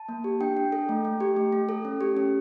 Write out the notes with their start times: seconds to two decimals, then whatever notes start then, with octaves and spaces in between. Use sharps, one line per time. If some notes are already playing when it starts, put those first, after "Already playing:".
Already playing: A5
0.09 A#3
0.24 G4
0.41 D4 G5
0.57 D4
0.72 A4
0.89 A3
1.05 A3
1.20 G4
1.37 A3
1.52 A3
1.69 A4
1.85 C#4
2.01 G4
2.17 C#4